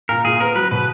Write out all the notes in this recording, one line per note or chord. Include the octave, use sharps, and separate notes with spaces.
A#2 A#4
A#2 G#4
B3 A#4
F#3 B4
B2 B4